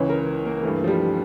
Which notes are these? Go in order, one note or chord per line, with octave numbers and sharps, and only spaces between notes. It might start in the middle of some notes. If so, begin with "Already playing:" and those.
Already playing: C#2 C#3 E3 C#5
A#4
A#3
G2 E3 A3
F3
G3